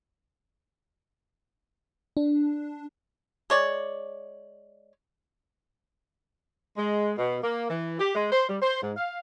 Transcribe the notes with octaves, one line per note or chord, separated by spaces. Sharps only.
D4
G#3 C#5 D5
G#3
B2
A#3
E3
G4
G#3
C5
G3
C5
G#2
F5